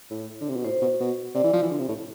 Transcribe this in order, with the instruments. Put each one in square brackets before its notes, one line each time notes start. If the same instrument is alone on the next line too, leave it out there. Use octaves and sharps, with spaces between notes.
[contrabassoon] A2
D3
C3
B2
[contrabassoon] A2 [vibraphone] C5
[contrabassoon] B2
B2
[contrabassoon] C3 [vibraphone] D5
[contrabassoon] E3
F3
E3
D3
C3
A2